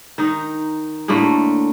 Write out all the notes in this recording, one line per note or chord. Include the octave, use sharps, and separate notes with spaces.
D#3 D#4
A2 D3 A3 A#3